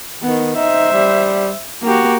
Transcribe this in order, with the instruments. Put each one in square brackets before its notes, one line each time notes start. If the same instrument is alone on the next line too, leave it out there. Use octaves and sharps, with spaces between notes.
[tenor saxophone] D#3 [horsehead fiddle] B3
[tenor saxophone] D#4 [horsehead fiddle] C5 E5
[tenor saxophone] G3
[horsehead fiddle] A#3 G4 [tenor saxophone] F#4